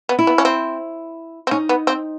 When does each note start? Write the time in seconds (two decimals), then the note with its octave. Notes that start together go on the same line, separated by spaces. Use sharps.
0.09 B3
0.19 E4
0.27 B3
0.38 C#4
0.45 C4
1.47 C4
1.51 C#4 D#4
1.69 B3
1.87 C4